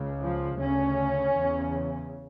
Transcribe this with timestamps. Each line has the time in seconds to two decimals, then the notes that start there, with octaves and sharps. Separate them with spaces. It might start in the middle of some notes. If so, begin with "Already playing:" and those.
Already playing: C#2 C#3
0.20 F3
0.59 D2 C#3 C#4
1.36 E2 C#3